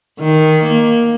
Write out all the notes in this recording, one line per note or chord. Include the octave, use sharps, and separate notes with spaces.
D#3
A#3